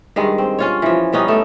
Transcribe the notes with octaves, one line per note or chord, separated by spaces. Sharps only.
G2 D#3 G#3
C4
C#4 F4 C#5
E3 F3
G3 B3 C#4 D#4
A3 A4